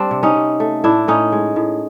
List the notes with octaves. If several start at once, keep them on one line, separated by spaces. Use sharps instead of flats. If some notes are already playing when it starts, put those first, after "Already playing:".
Already playing: G3 C4 D4
C3
C#4 D#4
C3
A3
A2 D4 E4
A2 C#4 D#4
G#3
A2